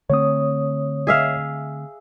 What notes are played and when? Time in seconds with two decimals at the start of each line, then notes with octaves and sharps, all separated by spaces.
0.10 D3 A3 C4 C#5 D#6
1.07 G#4 E5 F5